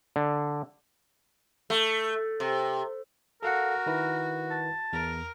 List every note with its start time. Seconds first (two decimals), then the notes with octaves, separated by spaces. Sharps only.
0.16 D3
1.70 A3
2.40 C3
3.43 F#4 A4 A#4 F5 F#5
3.86 D#3 E4 B4
4.51 A5
4.93 E2 A#4